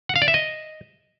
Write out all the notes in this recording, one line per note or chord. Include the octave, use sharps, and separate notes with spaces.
F#5
F5
D5
E5
D#5